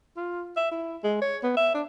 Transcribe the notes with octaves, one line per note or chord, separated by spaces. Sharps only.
F4
E5
E4
G#3
C#5
B3
E5
D4